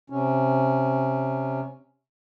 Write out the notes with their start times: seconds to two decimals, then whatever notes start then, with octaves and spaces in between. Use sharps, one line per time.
0.10 C3 C#4